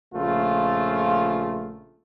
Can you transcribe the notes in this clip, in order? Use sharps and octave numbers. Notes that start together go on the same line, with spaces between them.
A#1 C#3 A3 F4